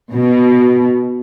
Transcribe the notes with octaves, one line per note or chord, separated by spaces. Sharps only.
B2